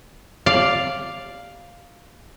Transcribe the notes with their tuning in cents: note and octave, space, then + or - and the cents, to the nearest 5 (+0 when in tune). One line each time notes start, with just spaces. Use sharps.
D5 +0 F5 +0